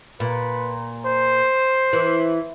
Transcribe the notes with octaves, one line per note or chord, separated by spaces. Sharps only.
A#2 B4
C5
E3